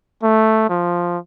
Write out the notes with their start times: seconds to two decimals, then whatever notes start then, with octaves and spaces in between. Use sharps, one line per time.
0.23 A3
0.69 F3